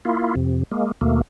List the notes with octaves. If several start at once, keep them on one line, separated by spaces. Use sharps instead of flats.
A#3 E4 F4
F2 C3
G#3 A#3
D#2 B2 A3 A#3